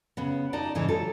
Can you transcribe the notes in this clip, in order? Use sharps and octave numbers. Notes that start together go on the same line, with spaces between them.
C#3 B3
D#4 D5 A5
G#2 C#3 E3
F#3 A4